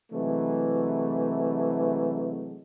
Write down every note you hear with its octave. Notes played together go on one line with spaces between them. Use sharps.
C3 E3 F#3 G#3 A3